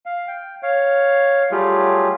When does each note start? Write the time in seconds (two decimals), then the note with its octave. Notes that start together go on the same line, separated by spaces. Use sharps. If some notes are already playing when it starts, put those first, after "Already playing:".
0.06 F5
0.28 G5
0.63 C#5 F5
1.51 F#3 G3 A3 F4 G4 G#4